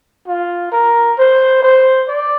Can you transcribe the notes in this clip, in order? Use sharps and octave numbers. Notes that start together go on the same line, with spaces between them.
F4
A#4
C5
C5
D5